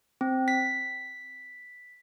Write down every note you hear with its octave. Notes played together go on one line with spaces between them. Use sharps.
C4
B6